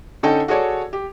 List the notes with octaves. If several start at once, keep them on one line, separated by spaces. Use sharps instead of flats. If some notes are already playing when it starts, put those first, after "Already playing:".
D3 C#4 D#4 A4 G5
F#4 G#4 A4 C#5 D5
G4